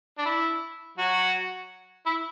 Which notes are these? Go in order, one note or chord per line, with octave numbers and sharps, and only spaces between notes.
D4
E4
F#3 F#4
E4